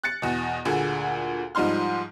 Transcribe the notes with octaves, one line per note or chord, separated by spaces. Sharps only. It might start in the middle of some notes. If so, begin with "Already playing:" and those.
F#6 A6 C#7
E2 B2
D2 A#2 D3 G#4
G#2 F3 G3 D#4 C6 F6